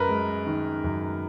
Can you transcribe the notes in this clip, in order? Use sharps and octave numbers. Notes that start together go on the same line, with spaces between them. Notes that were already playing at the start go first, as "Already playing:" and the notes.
Already playing: F#2 A#4 B4
G#3
D#3
F#2